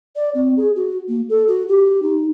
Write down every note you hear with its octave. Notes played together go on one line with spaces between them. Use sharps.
D5
C4
G#4
F#4
A#3
A4
F#4
G4
D#4